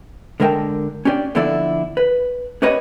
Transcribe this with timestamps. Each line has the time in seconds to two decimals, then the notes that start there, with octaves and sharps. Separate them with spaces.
0.40 D3 G#3 A#4 F5 G5 A5
1.05 C#4 D4 G4 D5
1.35 D3 F3 B3 E4 A4 D5
1.97 B4
2.62 C#4 G4 B4 C#5 D#5 B5